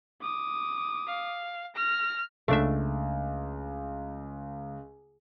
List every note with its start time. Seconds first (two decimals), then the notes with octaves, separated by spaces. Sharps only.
0.22 D6 D#6
1.07 F5
1.75 F6 A#6
2.48 C#2 A3 D4 E5